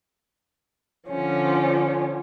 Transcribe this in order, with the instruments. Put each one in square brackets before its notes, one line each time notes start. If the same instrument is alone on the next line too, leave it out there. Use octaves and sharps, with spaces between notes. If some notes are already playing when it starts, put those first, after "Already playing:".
[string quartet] D3 F3 C#4